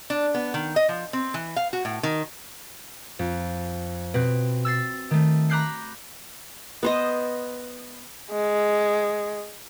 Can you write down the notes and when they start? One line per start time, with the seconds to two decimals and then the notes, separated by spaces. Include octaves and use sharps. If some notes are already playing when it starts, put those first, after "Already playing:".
0.10 D4
0.35 B3
0.54 D#3
0.76 D#5
0.89 F3
1.13 C4
1.34 E3
1.56 F5
1.73 F#4
1.85 A2
2.03 D#3
3.19 F2
4.14 B2 C4 B4
4.65 E6 A6 C7
5.11 D#3 A3
5.50 A#5 B5 D6 F#6 G6 C7
6.83 B3 C5 D#5
8.31 G#3